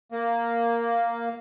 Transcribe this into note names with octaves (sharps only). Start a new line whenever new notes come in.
A#3